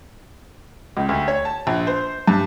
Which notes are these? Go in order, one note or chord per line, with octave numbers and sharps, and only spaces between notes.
C#2
D2
C#5
A5
A#1
C5
G2